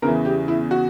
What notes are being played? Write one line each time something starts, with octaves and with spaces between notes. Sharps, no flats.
E2 C#3 E3 A#4
G4
E4
F#4